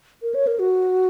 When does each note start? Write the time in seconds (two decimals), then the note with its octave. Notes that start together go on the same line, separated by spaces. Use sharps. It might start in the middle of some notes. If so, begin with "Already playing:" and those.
0.22 A#4
0.35 C#5
0.47 A#4
0.59 F#4